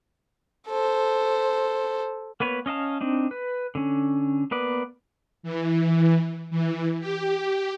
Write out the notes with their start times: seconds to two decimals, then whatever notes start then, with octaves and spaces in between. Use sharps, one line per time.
0.68 A4 C5
2.40 A#3 B3 B4 C#5
2.66 C#4 D#5 F5 A5
3.01 C4 D4 D#4
3.31 B4
3.75 D3 C#4
4.51 A#3 B3 B4 D5
5.43 E3
6.51 E3
7.00 G4